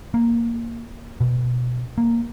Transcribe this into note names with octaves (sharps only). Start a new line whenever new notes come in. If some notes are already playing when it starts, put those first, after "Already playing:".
A#3
B2
A#3